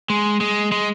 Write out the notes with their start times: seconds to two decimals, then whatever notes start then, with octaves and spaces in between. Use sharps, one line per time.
0.10 G#3
0.41 G#3
0.72 G#3